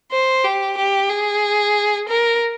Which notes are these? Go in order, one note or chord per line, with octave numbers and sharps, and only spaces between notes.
C5
G4
G4
G#4
A#4